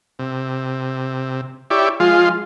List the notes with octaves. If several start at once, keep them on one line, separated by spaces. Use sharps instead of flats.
C3
E4 G4 C#5 D5
F3 G#3 F4 C6